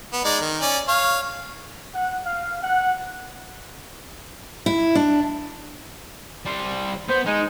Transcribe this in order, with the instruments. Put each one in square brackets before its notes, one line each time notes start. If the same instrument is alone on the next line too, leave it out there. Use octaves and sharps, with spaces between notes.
[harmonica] B3
G#3 D#4 D5
D#3
C#4 D5
C#5 F5
[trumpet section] F#5
F5
F#5
[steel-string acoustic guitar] E4
D4
[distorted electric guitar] G3 C5
[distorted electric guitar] B3 [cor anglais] C5
[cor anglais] G#3 [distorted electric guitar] D#4